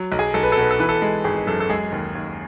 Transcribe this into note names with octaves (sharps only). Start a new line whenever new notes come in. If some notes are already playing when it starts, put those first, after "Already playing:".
Already playing: F#3
B1
G#4 G#5
B1 A4
B4
A4
B2 B4
A4
E3 B4
A4
G#3
G#1 G#4
F#2 A4
A4
G#3 G#4
D#2
D#2